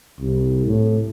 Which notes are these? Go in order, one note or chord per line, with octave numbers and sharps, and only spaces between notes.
C2
A2